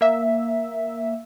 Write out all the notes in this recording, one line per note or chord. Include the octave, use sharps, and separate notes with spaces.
A#3 E5